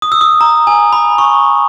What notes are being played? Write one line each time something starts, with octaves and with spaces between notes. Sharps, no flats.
D#6
E6
D#6
A#5
G#5
B5
C#6